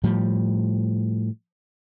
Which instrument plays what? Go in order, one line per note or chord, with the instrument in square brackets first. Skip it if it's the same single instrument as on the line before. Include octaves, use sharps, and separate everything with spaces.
[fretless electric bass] A2 F3 G3